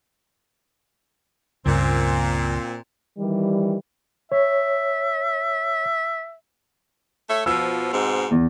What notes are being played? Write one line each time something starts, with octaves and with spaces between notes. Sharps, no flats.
C#2 G2 A#2 C#3 C4
D#3 E3 G3
C#5 E5
A3 C#5 E5
B2 F3 E6
G#2 B2 C4
E2